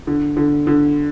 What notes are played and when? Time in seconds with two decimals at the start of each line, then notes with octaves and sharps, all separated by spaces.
0.07 D3
0.37 D3
0.67 D3